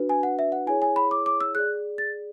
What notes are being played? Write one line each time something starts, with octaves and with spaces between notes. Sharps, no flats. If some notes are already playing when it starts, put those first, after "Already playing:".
Already playing: D4 F#4 B4
G#5
F#5
E5
F#5
E4 G#4 C#5 G#5
G#5
B5
D6
D6
E6
G#4 D5 F#6
A6